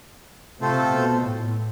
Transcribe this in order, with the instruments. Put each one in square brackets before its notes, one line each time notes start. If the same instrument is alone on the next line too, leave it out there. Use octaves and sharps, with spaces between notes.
[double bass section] C3 [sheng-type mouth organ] A3 C4 F4 A4 C5
[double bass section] B2
A2